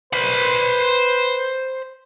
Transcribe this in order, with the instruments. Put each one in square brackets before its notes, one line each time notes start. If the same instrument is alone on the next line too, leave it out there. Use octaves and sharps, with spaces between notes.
[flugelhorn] B4 [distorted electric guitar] C5 B5